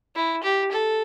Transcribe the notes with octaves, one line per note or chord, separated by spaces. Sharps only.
E4
G4
A4